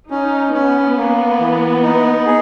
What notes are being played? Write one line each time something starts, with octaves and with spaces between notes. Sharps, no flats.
C#4 D#4
B3 C#4
A#3
E3
D#4
G#4